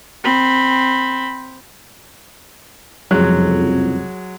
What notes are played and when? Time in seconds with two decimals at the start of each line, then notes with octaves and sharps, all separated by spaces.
0.24 C4 B5
3.11 F#1 C2 F2 F#3 G#3 F#6